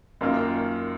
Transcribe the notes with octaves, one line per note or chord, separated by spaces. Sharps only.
F#2 D#3 A#3 F4 A#4